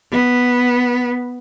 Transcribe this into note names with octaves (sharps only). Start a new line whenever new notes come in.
B3